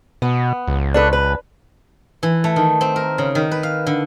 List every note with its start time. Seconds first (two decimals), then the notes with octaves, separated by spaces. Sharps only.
0.22 B2 B3
0.68 C#2
0.94 D4 A4 B4
1.13 B4
2.23 E3
2.44 A3
2.56 D#3
2.81 C4
2.96 A#4
3.18 C#3
3.35 D#3
3.51 B4
3.63 F5
3.87 D3